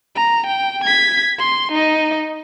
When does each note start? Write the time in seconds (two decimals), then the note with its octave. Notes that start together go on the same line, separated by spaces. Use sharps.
0.15 A#5
0.46 G5
0.84 G#6 B6
1.39 C6
1.72 D#4 D#5